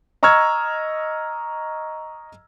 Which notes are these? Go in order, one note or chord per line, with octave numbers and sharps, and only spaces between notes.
D#5 A#5 C#6 E6 F6 G#6